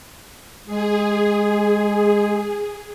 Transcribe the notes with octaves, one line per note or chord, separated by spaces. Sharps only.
G#3 G#4